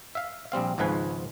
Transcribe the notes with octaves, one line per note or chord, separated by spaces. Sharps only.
E5 F5
A#1 G3 C4 F5
G#1 C#2 G#2 F3 B4 G#5